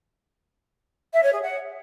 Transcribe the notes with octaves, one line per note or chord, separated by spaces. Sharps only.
E5
C#5
G#4
F#5